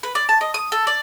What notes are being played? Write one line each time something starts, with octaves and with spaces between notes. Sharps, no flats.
B4
D5
A5
D#5
D#6
A4
D5